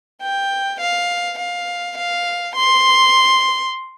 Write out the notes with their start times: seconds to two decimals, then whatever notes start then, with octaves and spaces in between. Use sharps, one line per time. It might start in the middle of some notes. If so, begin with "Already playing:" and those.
0.22 G5
0.80 F5
1.39 F5
1.97 F5
2.56 C6